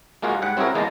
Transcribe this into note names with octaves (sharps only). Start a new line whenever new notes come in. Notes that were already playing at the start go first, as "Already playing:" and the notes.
G#3 A#3 F4 F#4 G#4
G#2 G3 F#5
C4 C#4 E4 F#4 G#4 A#4
E2 G#3 A#3 D#4 A5 A#5